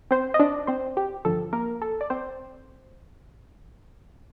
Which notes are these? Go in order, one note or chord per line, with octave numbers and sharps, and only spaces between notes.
C4 C5
D#5
D4 D5
C4 C5
G4
A1 G2 D3 F3 A4
A#3 A#4
A4
D5
C4 C5